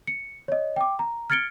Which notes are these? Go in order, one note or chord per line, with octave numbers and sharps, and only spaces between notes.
C#7
C#5 D#5
G5 D6
A#5
F6 G#6 A6 C#7 D7 G7